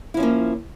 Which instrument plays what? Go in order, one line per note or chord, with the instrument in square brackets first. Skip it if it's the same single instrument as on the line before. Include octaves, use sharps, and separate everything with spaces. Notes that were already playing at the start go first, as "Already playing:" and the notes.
[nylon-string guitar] E4
F3
C#4
A#3